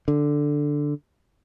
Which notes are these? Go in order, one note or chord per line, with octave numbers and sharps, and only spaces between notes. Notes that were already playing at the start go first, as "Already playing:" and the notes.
D3